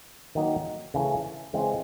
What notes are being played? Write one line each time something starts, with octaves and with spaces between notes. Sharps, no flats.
D#3 F#3 A#3 D#4
C#3 E3 A3
C#3 E3 G#3 C4